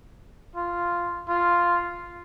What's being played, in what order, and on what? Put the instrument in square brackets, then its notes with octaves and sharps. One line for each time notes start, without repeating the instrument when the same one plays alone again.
[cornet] F4
F4